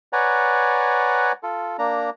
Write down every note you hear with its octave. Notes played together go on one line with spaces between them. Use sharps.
B4 C#5 D5 F#5 G#5 A#5
F4 A4
A#3 D4 A#5